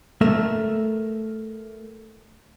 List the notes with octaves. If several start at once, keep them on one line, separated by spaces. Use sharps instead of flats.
A3 A4 A#4 E5